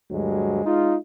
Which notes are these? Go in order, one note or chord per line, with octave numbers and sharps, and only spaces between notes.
D2 G2 F#3 G#3
G#3 D#4 F4